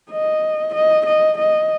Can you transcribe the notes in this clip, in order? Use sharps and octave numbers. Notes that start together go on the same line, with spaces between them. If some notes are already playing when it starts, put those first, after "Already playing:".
D#5
D#5
D#5
D#5